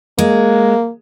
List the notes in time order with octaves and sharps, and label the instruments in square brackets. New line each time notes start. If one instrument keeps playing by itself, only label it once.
[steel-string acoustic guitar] G#3 [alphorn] A#3